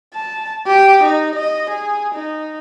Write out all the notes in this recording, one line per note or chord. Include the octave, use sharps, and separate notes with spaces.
A5
G4
D#4
D#5
G#4
D#4